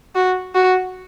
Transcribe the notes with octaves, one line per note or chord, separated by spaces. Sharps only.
F#4
F#4